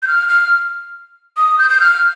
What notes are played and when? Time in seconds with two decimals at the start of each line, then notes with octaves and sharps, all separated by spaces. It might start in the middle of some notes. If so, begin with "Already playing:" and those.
0.03 G6
0.08 F6
0.29 F6
1.37 D#6
1.59 G6
1.70 G6
1.80 F6